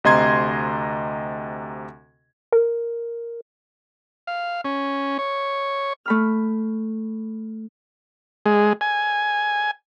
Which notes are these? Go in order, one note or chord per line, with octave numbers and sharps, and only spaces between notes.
D2 C3 D#5 A#5 C6 G#6
A#4
F5
C#4
C#5
A3 B5 F6
G#3
G#5